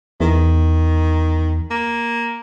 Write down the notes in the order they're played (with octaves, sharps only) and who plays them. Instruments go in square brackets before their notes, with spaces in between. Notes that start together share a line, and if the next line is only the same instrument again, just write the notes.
[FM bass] E2 [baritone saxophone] D#3
[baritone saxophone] A#3